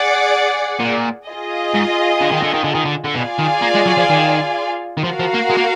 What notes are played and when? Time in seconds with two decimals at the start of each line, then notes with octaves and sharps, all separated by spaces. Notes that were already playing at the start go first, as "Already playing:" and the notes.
Already playing: G#4 D5 F#5
0.80 A#2
1.27 F4 G#4 D#5
1.74 G#2
2.21 D3
2.31 D#3
2.42 D3
2.54 D#3
2.64 D3
2.74 D#3
2.85 D3
3.05 D3
3.15 B2 F4 G#4 D5 F5 G#5
3.39 D#3
3.62 A#3
3.75 G#3
3.86 F#3
3.97 F3
4.10 D#3
4.97 D#3
5.03 F3 F#4 A#4 F5
5.20 F3
5.34 A#3
5.50 G#3
5.58 A#3